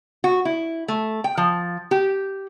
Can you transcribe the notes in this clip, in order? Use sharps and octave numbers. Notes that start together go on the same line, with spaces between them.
F#4
E4
A3
G5
F3
G4